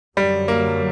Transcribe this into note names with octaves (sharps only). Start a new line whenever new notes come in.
F#2 D3 F#3 G3
A#3